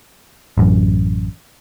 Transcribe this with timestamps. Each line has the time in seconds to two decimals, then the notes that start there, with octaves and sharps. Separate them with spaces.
0.58 A1 F#2